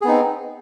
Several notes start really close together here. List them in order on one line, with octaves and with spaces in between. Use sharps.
G#4 B3 D#4 C4